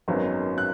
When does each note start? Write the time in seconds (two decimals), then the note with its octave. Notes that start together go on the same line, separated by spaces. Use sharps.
0.08 G#1 F#2 D#3 F#3 B3
0.58 F#6